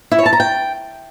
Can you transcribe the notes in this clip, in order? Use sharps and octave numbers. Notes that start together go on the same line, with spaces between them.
E4
C#5
A5
A#5
G5